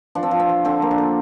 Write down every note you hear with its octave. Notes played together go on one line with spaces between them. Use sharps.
F3 D4
C4
F3
C4
F3
D3 C4
A#3
D4
D3